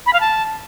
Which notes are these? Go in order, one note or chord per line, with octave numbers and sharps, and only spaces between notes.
B5
F5
A5